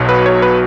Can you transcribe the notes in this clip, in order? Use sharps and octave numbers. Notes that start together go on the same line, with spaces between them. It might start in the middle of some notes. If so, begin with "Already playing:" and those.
Already playing: B1 B2 F#3
B4
C#5
B4